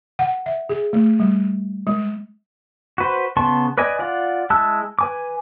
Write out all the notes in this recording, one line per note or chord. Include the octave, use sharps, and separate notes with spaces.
F#5
E5
G#4
A3
G3
G#3
F#4 B4 C5
C#3 B3 A5 C6 C#6
B4 D5 D#5 G#5
F4 D5 F#5
G#3 E4 A5 E6 F#6
B4 G#5 D6